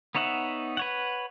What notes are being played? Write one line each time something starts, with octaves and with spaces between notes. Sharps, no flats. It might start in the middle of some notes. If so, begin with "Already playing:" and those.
B3 D#4 C#5 E5 F#5
B4 C#5 F#5